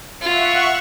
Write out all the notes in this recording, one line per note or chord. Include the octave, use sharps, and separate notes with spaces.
F4 E5 F#5 C#6